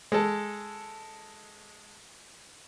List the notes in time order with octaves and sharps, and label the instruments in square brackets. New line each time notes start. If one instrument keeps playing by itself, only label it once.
[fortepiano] G#3 A4